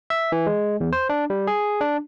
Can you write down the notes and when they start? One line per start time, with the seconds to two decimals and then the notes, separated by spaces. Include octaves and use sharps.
0.10 E5
0.32 E3
0.46 G#3
0.80 E2
0.93 C5
1.09 D4
1.30 G3
1.47 G#4
1.81 D4